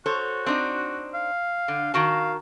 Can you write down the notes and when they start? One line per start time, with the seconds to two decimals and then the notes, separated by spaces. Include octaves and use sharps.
0.06 F#4 A4 C5 C#5
0.46 C4 D4 D#4
1.14 F5
1.68 D3
1.94 D#3 F#4 F5 A5